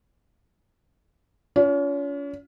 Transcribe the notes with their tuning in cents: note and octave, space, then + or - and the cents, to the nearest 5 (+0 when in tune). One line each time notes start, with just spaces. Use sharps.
C#4 +40 F4 +0